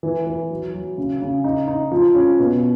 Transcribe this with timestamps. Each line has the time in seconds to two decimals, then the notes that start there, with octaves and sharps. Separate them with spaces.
0.03 E3
0.27 E3
0.50 F#3
0.74 F#3
0.98 C#3
1.22 C#3
1.44 D#4
1.68 D#4
1.92 F3
2.15 C#4
2.39 B2